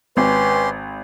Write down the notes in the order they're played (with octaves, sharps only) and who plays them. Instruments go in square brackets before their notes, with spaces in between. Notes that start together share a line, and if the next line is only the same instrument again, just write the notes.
[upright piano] G#1 [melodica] C#4 G4 C6 [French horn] B4